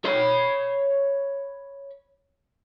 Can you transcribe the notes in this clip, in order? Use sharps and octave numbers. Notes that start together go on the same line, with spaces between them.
C#5 B5